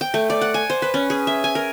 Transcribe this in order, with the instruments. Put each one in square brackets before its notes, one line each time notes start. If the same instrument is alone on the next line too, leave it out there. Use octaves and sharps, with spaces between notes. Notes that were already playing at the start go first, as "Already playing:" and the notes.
[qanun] G5
A3
D5
F#5
G#5
C5
B4
C#4
G#4
E5
G#5
A#4